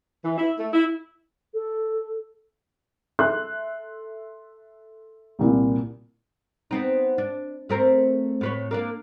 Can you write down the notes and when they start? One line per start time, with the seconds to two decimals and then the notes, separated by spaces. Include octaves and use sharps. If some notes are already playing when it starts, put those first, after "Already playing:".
0.23 E3
0.36 E4
0.58 A3
0.71 E4
1.54 A4
3.19 A4 E5 C6 F#6
5.39 C2 A#2 E4
6.71 B3 C4 D#4
7.18 D4
7.69 A3 C4 A#4
8.41 A2 B4 C#5
8.71 A#3 D4 A#4